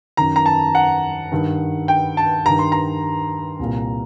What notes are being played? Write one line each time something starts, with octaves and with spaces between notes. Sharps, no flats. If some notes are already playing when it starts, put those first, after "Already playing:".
F#2 D#3 A#5
A#5
A5
F#5
G2 D#3
G5
A5
G2 D#3 A#5
C6
A#5
C2 A#2